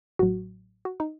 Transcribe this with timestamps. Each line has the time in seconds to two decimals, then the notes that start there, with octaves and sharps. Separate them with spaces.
0.19 A1 A2 F#3 F#4
0.85 F#4
1.00 D#4